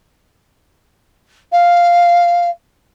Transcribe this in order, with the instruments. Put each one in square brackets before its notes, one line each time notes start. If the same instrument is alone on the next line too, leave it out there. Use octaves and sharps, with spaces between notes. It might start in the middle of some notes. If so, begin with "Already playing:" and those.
[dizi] F5